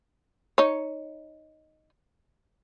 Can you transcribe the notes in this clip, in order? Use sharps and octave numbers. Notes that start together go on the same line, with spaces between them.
D#4 C#5